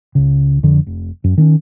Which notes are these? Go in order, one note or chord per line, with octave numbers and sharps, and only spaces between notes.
C#2 C#3
F2 D3
F1
F#2
D#3 C4 C#4